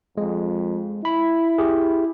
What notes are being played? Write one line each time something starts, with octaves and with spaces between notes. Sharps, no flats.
F2 G#3
E4 B5
G4 G#4